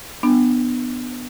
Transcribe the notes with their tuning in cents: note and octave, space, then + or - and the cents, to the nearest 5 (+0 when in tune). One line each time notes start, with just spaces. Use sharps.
B3 +0 D4 +20